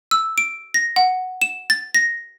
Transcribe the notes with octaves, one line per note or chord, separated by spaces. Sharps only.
E6
D7
A#6
F#5
E7
A6
A#6